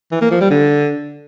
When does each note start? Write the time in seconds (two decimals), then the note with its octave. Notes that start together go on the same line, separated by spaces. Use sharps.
0.12 E3
0.21 A#3
0.31 F3
0.41 G3
0.50 D3